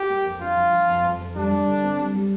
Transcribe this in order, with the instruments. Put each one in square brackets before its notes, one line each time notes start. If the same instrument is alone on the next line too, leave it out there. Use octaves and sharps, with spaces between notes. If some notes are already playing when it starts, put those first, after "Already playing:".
Already playing: [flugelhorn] G4
[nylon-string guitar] A#3
F2
[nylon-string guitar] D4 [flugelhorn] F4
[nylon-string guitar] F3
F3
F2
F2
F2
[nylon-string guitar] G3 [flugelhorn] D4
[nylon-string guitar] G3
D3
C4
G3
G3